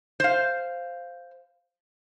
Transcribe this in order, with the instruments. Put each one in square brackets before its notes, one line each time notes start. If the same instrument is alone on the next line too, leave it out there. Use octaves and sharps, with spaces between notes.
[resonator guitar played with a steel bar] C5 F5